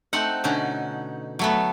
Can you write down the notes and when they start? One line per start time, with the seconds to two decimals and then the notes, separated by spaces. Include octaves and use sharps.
0.13 A3 C4 D#4 F#5
0.44 B2 D3 C#4 D#4
1.39 F#3 A3 B3